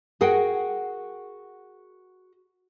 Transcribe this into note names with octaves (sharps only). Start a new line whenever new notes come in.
F#4 G#4 A#4 F#5 G5